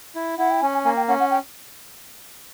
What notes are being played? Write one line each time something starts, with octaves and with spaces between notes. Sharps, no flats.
E4
E4 F#5
G5
C#4 G#5
G#5
A#3 G#5
G5
C#4 F#5
F#5
G5